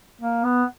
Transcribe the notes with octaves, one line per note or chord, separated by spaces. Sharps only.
A#3
B3